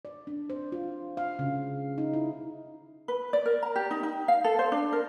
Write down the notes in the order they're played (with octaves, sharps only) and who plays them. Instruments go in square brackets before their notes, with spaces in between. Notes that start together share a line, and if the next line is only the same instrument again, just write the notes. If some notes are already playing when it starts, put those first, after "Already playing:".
[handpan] D5
D4
C5
F4
F5
C#3
D#4
E4
[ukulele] B4
D5
A#4
A#5
G4
D#4
D#4
F5
A4
C5
D4
A#4